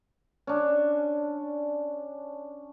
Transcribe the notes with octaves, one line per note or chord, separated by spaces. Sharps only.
C#4 D4